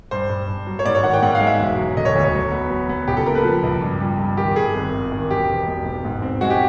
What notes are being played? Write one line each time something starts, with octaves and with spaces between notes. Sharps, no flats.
G2 C5
G2
G2
F#3
C#5
G#2 D5
C#5
D#3 F#5
G5
G#2 F#5
F5
G#3
E5
E1
F#3
D3 D#5
C#5
D2
C#5
F#3
B3
F#3
B3
C#2 G4
A4
A#3 A#4
B4
F3
C#2
G2
G3
G2
D#3 G4
G2 G#4
G#1
G#1
D#3
E1 G4
E1
E1
E1
G#2
C4
G#3 F#4
G4